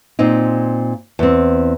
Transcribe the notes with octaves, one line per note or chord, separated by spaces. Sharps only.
A#2 C4 D#4
E2 C4